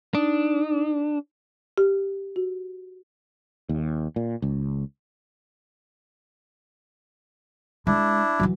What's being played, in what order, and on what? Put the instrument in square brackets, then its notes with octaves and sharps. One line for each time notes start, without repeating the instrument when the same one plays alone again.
[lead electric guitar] D4 [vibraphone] D#4
[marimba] G4
F#4
[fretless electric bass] D#2
A#2
C#2
[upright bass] G#3 [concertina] D4 E4
[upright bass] E3 F#3